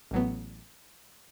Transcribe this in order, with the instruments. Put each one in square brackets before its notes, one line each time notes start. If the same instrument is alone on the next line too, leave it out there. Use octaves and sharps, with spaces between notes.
[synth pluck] A1 A2 F#3 B3